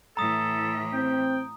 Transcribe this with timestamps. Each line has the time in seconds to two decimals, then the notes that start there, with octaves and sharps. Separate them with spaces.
0.17 A2 E3 A4 A#5 D#6
0.93 C4 G5